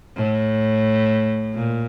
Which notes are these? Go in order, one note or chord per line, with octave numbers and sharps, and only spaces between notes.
A2
A#2